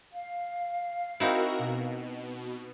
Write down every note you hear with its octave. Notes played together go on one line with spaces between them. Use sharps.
F5
C4 D#4 E4 F#4 A#4
B2